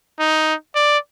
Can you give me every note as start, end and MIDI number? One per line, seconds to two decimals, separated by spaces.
0.19 0.54 63
0.75 0.98 74